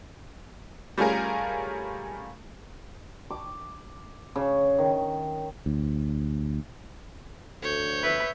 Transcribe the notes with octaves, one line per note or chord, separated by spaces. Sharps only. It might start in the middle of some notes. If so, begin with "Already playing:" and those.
G3 A3 C#4 F4 G#4 A#4
D6
C#3
D#3
D2
D2 C#5 G6
B4 E5